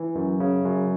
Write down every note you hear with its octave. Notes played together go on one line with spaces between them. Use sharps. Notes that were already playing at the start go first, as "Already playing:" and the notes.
Already playing: E3
F#2
C#3
F#2